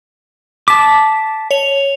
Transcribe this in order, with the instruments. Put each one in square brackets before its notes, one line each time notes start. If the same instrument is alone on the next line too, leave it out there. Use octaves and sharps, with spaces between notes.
[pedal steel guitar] A5 D6 [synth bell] B6
[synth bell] C#5 F7